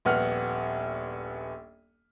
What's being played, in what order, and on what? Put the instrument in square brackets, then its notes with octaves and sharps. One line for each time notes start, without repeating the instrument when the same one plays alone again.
[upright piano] D#1 A#1 B3 F#5 F6